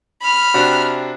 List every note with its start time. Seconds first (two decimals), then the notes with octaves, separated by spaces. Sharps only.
0.22 B5 F6
0.54 C3 D4 F#4